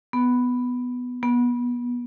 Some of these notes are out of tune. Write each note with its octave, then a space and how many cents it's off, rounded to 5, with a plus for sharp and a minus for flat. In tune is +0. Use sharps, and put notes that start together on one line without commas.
B3 +5
B3 -25